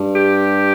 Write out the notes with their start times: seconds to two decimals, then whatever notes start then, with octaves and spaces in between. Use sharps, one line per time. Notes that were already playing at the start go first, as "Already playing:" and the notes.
Already playing: G2
0.15 G4